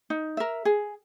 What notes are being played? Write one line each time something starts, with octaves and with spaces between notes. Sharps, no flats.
D#4
A#4 E5
G#4